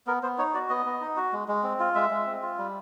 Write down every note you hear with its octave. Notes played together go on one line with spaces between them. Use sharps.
B3 A#4
B3 C5
D#4 C#5
F#4 D5
B3 D#5
B3
D#4
F#4
G#3
G#3
C4
F4
G#3 E5
G#3
C4
F4
G3